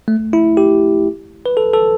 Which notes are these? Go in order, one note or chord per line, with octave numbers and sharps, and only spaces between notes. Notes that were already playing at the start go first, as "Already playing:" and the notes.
A3
E4
G4
B4
A4
A4